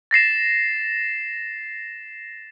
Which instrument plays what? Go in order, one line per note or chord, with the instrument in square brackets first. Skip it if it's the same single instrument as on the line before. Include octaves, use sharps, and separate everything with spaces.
[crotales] A6 A#6 C7 E7